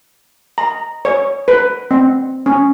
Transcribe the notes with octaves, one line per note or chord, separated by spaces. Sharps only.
A#5
C#5
B4
C4
C#4